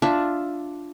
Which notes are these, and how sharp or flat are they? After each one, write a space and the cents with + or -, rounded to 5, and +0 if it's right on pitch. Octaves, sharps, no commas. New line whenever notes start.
D4 +0 F4 +0 E5 +0